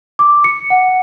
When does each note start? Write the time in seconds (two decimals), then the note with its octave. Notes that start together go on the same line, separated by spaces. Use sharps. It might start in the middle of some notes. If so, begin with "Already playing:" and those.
0.19 D6
0.44 C#7
0.70 F#5